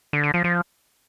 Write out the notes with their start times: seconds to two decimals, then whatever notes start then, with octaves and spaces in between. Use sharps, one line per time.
0.13 D3
0.24 D3
0.34 F3
0.44 F3